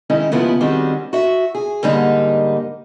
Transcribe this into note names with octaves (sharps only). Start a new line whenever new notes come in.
D#3 G#3 C#4 D#4 E4 D#5
D#2 C#3 F3 B3 E4
D#3 G3 G#3 C4 C#4 F#4
F#4 E5
G#4
G#2 D3 G3 A#3 D4 D#4